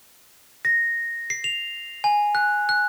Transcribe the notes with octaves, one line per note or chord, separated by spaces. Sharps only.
A#6
C7
F7
G#5
F#6
F#6